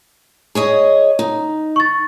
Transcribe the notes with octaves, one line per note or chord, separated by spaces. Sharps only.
G#4 C#5 D#5
D#4
C#6 A6